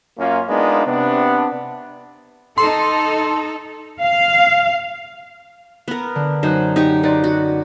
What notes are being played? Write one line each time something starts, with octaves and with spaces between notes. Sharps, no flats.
F#2 A#3 C#4 F4
G#3 B3 D4 D#4 F4 A#4
C3 B3 D4
D#4 A4 C6
F5
B3 A#4
D3
F#2 D#4 C5 F#6
D#4 G4 C#6
D#4 B4 D5 C6
F#4